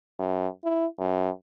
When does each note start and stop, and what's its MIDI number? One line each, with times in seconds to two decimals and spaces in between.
0.19 0.48 42
0.64 0.87 64
0.98 1.30 42